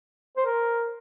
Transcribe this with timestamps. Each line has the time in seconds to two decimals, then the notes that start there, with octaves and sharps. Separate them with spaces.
0.37 C5
0.46 A#4